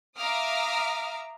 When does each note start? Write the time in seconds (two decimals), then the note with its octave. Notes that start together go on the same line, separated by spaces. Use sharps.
0.18 E5 F5 A#5 D6 D#6 F6